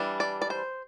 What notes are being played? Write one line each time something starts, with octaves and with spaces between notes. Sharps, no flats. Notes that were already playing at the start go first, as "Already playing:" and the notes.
Already playing: E3 G3 D4
D5
D5
C5